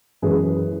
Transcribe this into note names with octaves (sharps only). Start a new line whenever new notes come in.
F#2 E3 G#3 G#4 B4